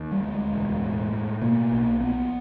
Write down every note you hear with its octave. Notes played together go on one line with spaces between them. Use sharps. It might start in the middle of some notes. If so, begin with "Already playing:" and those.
Already playing: D#2
G3
D2 G#3
E1
A2
A2
B2 A#3
B1
A#1 B3